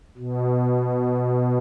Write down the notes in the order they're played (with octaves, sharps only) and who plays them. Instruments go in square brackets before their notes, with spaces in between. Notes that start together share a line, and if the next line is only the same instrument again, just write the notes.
[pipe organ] B2